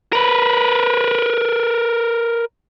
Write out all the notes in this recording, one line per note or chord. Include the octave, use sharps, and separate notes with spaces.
A#4 B4